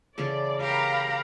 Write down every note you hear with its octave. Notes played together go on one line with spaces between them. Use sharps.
C#3 E3 A4 D5
G4 A#4 F5 A#5 B5